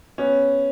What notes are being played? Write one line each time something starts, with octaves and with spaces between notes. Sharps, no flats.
B3 C#4